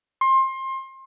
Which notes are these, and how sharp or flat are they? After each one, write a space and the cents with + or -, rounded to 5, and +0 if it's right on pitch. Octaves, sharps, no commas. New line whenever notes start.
C6 +25